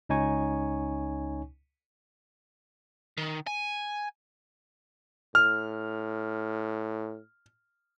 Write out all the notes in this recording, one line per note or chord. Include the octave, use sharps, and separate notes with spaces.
C#2 C#4 D#4 C#5 G#5 C#6
D#3
G#5
A2 F6